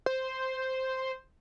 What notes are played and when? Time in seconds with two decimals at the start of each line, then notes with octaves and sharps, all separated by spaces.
0.06 C5